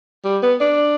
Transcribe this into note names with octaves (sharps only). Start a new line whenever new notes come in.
G3
B3
D4